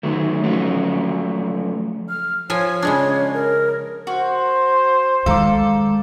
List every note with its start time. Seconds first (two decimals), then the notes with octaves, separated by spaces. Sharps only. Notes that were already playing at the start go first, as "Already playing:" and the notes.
0.03 D#3 F#3 A3
0.44 F3 F#3 A3 C#4
2.09 F6
2.50 F3 F4 C#5 G#5
2.82 C#3 G#3 D4
3.34 A#4
4.07 F#4 C5
5.26 D#3 G#3 A4 F5 A#5 D6